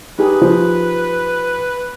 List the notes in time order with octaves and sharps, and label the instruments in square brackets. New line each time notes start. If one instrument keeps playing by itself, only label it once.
[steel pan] D#4 G4 G#4 [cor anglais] B4
[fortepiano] F3